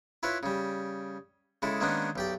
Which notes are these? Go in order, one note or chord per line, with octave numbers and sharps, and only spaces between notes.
E4 F4 B4 C#5
C#3 G3
C#3 G#3 E4 A4
D#3 G#3 A#3 B3 C#4 D4
B1 G4 D5